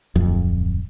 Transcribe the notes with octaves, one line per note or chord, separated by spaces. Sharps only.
D1 F2